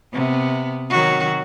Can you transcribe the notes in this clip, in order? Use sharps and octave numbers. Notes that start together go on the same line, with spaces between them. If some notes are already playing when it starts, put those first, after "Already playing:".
C3 B3
D#3 F#3 F#4